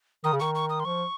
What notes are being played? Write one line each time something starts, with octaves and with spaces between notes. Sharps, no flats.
D#3 D#6
C#3
D#3 C#6
C#6
D#6
C6
F3 C#6